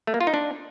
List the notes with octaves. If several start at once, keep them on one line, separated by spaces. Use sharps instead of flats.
A3
A#3
F4
D#4
D4